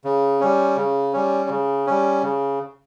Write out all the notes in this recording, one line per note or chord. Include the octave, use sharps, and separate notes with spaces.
C#3
G3 C#4
C#3
G3 C#4
C#3
G3 C#4
C#3